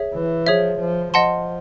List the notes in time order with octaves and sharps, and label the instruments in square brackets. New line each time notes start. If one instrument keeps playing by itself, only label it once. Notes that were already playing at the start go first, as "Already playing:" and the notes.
Already playing: [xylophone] G#4 C#5 E5
[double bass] E3
[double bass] F3 [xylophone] G#4 C#5 E5
[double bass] F3
[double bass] F3 [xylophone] D#5 F#5 A5 C6